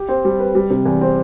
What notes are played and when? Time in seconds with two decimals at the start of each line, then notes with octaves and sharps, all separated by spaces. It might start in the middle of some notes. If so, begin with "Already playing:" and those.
Already playing: G4
0.09 C4
0.25 G3
0.39 B4
0.55 G3
0.70 C3
0.85 E2
1.01 C4